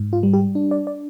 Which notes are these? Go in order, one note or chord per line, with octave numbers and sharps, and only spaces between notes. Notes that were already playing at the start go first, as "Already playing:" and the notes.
Already playing: G#2
F4
G3
G4
D4
D5
D5